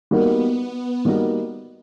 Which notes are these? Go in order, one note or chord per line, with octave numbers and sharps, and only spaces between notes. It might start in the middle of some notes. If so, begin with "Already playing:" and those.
G3 A#3 B3 D#4 F#4 A#4
G3 A#3 D#4 F#4 A#4